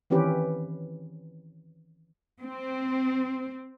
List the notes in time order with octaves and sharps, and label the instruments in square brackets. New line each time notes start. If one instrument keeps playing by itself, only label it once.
[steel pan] D#3 E3 C4 C#4 G4 B4
[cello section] C4